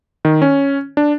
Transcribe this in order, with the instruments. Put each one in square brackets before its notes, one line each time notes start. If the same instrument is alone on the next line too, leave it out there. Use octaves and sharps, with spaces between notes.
[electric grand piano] D#3
C#4
D4